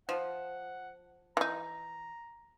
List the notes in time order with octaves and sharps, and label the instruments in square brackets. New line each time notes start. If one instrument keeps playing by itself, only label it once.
[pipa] F3 [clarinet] F#5
[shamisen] E3 D#4 [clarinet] A#5